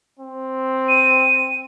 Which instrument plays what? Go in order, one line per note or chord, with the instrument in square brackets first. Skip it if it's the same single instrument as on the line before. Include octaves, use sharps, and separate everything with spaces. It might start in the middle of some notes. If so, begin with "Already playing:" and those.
[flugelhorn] C4
[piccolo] D#7